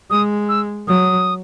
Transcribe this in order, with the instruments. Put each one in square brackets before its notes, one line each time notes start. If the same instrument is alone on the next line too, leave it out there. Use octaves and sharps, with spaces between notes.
[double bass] G#3 [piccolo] D#6
[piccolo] E6
[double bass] F#3 [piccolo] D#6